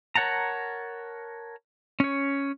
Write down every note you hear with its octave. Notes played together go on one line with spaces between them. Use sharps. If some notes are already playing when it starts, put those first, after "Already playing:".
A#4 C#5 F#5 A5 A#5
C#4 C#5